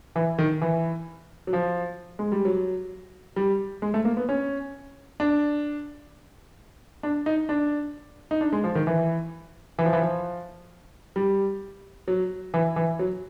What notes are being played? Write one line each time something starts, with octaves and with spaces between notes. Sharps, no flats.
E3
D#3
E3
F#3
F3
G#3
G3
F#3
G3
G#3
A3
A#3
B3
C#4
D4
D4
D#4
D4
D#4
D4
G#3
F3
D#3
E3
E3
F3
E3
F3
G3
F#3
E3
E3
F#3